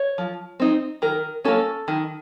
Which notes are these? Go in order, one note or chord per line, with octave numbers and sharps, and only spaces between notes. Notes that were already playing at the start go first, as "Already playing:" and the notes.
Already playing: C#5
F3
C4 D#4
D#3 A#4
A#3 C#4 A4
D#3